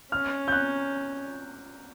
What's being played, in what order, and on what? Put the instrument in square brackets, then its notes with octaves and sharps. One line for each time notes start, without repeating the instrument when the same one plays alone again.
[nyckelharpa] C#4 [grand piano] F6
[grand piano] G6
F#6